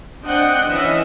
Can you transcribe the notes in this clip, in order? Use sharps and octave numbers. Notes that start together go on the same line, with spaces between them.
C4 D4 D#5 F#5 G5
E3 C#4 D#5 E5